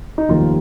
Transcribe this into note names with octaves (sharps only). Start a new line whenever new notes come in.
D#4
F1 D#2 D#3 G3 A#3 F4